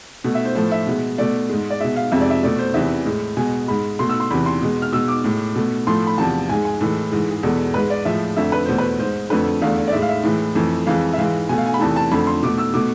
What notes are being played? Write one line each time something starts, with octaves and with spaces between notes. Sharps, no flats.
B2 A3
E5
C5
A2 F3 A3 C5
E5
B2 G#3
B2 A3 D5
G#2 G#3
D5
B2 G#3 E5
F5
F2 C3 G#3 E5
D5
E5
B2 A3 D5
C5
E2 C3 E3 E5
A2 G#3
B2 G#3 G#5
G#2 G#3 B5
B2 A3 C6
E6
C6
E2 C3 E3 B5
C6
B2 G#3
F6
B2 G#3 E6
D6
A2 G#3
B2 A3
A2 F3 A3 C6
B5
E2 C3 F3 A5
G#2 G#3 G#5
G#5
A2 E3 G#3 A4
G#2 E3 G#3
G#4
E2 B2 G#3 A4
G#2 G#3 B4
D5
A2 F3 G#3 E5
F2 D3 A3 E5
B4
E2 B2 A3 C5
B4
G#2 G#3 C5
F2 D3 A3 B4
E2 D3 A3 F5
D5
A2 G#3 E5
F5
E5
A2 E3 G#3
F2 E3 A3
F2 E3 G#3 F5
E5
G#2 E3 G#3 F5
B2 A3 G#5
F5
G#5
B5
E2 C3 E3 A3 A5
A5
F2 D3 A3 B5
C6
B2 A3 D6
E6
B2 A3 D6